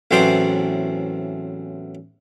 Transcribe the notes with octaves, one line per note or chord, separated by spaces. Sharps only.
A1 E2 F#3 C4 C5 D5